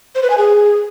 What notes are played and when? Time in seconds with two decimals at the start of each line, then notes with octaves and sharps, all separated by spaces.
0.15 C5
0.23 B4
0.30 G#5
0.38 G#4